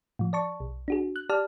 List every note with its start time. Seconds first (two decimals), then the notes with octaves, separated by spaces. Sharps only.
0.19 A2 F3
0.33 D5 A5 C#6
0.60 B1
0.88 D4 F#4 G#4
1.16 F#6
1.29 G4 D5 A5 F6